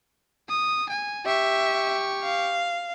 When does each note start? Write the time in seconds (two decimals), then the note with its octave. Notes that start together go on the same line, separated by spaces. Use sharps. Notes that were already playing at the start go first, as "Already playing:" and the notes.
0.49 D#6
0.89 G#5
1.25 G4 E5 C#6
2.23 F5